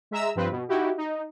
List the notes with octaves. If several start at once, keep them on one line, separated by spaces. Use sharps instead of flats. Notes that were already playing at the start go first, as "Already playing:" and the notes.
G#3 E5 A#5 E6
G2 F3 C4 B4
B2
D#4 E4 F#4 G4
D#4